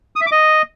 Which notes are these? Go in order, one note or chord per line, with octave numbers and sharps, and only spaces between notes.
D#6
E5
D6
D#5